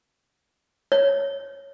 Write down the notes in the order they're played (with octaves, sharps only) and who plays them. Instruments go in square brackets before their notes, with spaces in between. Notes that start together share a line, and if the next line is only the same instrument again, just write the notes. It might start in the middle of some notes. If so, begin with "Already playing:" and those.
[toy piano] C#5